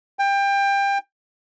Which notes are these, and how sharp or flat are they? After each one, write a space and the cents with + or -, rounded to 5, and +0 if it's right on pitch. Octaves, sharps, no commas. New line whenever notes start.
G5 +25